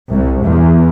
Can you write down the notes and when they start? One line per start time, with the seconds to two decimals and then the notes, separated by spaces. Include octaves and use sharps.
0.11 C2
0.44 E2